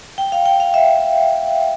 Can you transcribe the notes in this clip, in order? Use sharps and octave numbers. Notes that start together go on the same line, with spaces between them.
G5
F5
G5
F5
E5